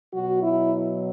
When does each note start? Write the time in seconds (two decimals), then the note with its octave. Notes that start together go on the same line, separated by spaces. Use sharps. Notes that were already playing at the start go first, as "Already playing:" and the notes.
0.14 B2 F#3 F#4
0.43 E4